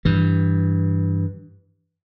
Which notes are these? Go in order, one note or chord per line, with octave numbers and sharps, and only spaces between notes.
G2 E3